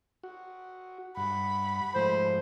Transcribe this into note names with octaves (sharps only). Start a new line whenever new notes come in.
F#4
G2 F#5 B5
G#2 F3 A3 C5